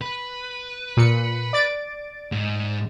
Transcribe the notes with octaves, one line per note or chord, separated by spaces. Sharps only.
B4
A#2 C#7
D5 A6 D7
G#2